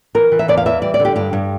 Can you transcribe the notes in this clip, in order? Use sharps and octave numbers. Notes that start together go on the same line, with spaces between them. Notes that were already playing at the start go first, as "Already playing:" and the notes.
E3 A#4
E3
E5
E2 D5
F5
E3 E5
G3 D5
D5
D3
G4
G2 G4
G2